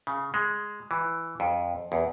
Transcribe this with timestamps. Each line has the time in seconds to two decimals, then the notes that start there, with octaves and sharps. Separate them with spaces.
0.07 C#3
0.34 G#3
0.91 E3
1.40 F2
1.92 E2